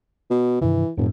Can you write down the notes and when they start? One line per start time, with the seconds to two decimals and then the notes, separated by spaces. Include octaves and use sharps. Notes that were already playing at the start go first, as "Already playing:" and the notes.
0.30 B2
0.61 G2 C3 D#3 E3
0.97 F1 F#2 A2